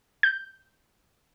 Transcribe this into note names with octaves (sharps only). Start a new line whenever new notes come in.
G6